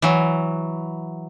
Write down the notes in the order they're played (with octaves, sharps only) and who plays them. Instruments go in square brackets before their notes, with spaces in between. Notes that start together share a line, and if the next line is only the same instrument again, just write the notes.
[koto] E3 F#3